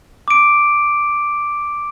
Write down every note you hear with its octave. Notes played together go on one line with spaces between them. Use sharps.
D6 D7